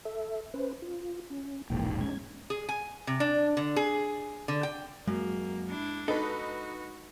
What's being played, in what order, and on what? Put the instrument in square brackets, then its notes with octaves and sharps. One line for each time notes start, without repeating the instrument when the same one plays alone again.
[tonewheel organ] A4 E5
C#4 B4 C5
F4
C#4
[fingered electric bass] E1 A#1 G#2 [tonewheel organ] E3 A#3 G5
[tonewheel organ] G#3 C#4 G#6
[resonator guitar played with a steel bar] G#4
G#5
C3
D4
D3
G#4
D3
G5
[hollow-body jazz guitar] F#2 [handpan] G#3 [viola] A#3
[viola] D4 E4
[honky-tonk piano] D#4 B4 [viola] F#4 [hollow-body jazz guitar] A4